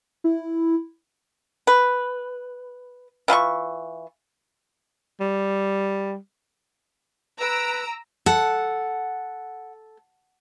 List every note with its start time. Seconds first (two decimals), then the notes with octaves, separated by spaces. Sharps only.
0.24 E4
1.67 B4
3.28 E3 F4 C6 C#6
5.20 G3
7.39 B4 A#5 E6 D7
8.26 A4 F#5